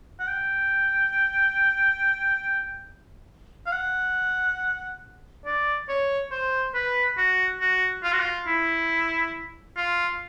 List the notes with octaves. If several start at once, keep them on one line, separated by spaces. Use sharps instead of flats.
F#5
G5
F5
F#5
D5
C#5
C5
B4
F#4
F#4
F4
F#4
F4
E4
F4